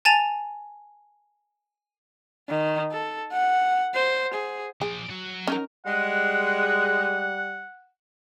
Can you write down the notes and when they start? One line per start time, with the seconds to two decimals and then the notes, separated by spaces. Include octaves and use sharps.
0.05 G#5 A5 A6 D#7 F7
2.49 D#3
2.92 A4
3.32 F#5
3.94 C5
4.34 G#4
4.81 F3 G#4 D5
5.10 F#3 F#4
5.47 C#4 D#4 A#4
5.86 G3 G#3 F#5 F#6